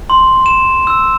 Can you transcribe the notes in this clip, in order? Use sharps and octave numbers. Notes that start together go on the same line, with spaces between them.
C6
E7
E6